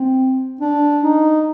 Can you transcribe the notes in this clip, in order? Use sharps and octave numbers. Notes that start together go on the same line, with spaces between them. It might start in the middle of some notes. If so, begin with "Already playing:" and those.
Already playing: C4
D4
D#4